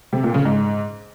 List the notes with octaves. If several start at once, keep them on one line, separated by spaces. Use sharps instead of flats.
C3
A#2
C#3
G#2